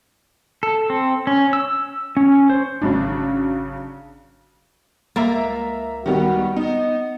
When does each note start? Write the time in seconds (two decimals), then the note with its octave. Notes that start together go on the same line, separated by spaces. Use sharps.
0.63 A4
0.90 C4
1.27 C#4
1.53 E6
2.17 C#4
2.50 C5
2.82 G#1 C#3 F#3 D4
5.16 C#2 A#3 E5 A#5 A6
6.06 D#3 G3 B3 F#4
6.57 B3 D#4 D#5